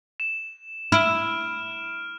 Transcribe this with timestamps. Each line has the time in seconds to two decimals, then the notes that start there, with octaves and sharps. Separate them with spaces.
0.20 E7
0.92 E4 F6 D7 E7